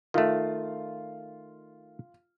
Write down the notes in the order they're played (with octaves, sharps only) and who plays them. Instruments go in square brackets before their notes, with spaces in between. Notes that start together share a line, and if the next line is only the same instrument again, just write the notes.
[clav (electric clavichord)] D#3 A3 [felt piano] F4